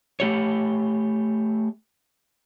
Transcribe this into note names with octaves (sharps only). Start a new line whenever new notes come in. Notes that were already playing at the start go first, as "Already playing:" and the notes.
A3 G4 C#5